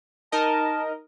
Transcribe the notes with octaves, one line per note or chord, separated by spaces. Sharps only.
D#4 A#4 D#5 A5